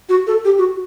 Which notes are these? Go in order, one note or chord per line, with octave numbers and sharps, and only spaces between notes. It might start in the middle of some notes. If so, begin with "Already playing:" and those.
F#4
A4
G4
F#4